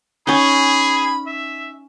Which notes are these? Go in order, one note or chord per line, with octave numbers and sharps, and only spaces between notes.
C#4 D#4 G#4 B5
E5